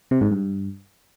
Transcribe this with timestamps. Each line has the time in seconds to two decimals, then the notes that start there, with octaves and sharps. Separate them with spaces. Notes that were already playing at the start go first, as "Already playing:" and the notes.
0.11 C3
0.21 G#2
0.31 G2